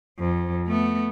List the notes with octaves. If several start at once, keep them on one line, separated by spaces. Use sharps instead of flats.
F2
A3 B3